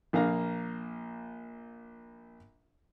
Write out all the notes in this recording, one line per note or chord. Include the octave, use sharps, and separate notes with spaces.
A#1 A#3 F5 A#5